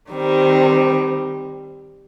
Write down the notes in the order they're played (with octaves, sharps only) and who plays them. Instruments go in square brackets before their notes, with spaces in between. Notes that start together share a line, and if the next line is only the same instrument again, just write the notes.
[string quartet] D#3 G3 C4